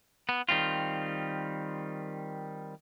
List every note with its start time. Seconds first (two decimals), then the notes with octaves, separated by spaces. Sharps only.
0.29 B3
0.49 D#3 G3 C4 F4